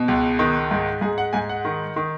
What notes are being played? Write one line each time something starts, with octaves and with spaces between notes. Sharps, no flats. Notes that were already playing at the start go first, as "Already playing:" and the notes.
Already playing: B2
C#2
D#3
G#2
G#2 G#4
F#5
G#2 G#5
F#5
D#3
D#3